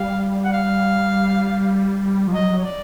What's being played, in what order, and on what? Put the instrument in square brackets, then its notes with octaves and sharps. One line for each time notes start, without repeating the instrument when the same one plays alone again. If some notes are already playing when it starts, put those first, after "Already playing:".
Already playing: [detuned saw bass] G3 [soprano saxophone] F5
[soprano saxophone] F#5
F5
[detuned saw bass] F3
[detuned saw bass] F#3 [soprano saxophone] D#5
[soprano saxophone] C#5
D5